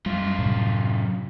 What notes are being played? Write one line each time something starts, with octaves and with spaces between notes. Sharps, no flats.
F#2 G3 F4
A2 C3